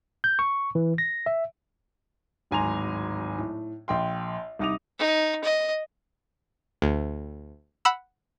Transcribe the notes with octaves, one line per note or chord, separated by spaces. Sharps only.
G6
C#6
E3
A#6
E5
D1 G#1 G#5 A#5 C6 F7
A2
A#1 G5 C6
C2 D#4 D6 D#6 F7
D#4
D#5
D2
F#5 B5 E6